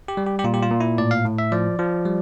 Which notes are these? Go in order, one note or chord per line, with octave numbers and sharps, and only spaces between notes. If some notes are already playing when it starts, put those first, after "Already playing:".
G4
G3
G4
G4
A#2 F4
G4
F4
A#2
E4
A2 D5
F5
A2
E5
F3 D5
F3
G3